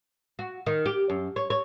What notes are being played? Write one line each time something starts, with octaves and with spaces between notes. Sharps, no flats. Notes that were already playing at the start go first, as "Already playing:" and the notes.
F#4
D#3
G4
F#2
C#5
C#5